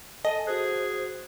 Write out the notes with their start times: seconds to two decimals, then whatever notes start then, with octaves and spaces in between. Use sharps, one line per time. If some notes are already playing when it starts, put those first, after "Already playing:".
0.25 A4 D#5 G#5 A5
0.47 F#4 G#4 C5 F#6